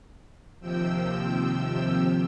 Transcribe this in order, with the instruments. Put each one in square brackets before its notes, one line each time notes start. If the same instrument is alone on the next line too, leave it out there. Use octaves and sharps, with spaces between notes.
[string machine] D#2 C3 F3 G5 E6